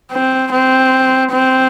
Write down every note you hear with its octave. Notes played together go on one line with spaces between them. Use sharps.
C4
C4
C4